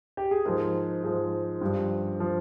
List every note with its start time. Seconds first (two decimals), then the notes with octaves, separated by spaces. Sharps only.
0.17 G4
0.31 G#4
0.45 G#2 F3 A#4
1.04 G#2 F3
1.61 G2 F3
2.20 F3